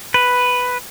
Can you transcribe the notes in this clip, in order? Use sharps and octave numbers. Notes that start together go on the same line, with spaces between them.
B4